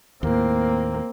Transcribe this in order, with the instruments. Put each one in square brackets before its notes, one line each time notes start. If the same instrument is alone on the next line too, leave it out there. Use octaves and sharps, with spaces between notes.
[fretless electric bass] D#2 A2 [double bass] A#3 C4